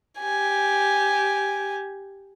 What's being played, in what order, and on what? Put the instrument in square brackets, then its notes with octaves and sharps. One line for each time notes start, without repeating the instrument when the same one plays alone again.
[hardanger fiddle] G4 G#5